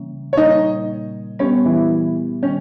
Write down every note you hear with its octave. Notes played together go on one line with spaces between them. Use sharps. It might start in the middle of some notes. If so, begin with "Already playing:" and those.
Already playing: C#3 E3 G3 A#3 C#4
C#5
A#2 G3 A#3 D#4 D#5
A#2 G3 B3 C#4 G4 C#5
E3 E4
D#3 G3 C#4